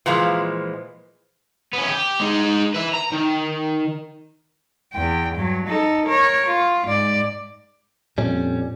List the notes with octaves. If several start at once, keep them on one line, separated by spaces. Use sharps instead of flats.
A#2 E3 F3 G#3
B3 C#4
G4
G#3 D#4
B4 E5
A#5
D#3
E2 G5
G2 F#3
D#4 A4
A#4 C#5
F4
G#2 D5
F2 A#2 G3 C#4